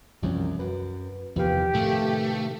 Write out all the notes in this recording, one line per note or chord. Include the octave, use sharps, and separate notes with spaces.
C2 F#2 E3 F3 C#4
F#2 F#4 B4
E2 C3 D#3 F3 G4 B4 F5
A2 C3 D#3 A3